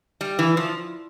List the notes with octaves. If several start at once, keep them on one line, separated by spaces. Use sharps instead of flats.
G3
E3
F3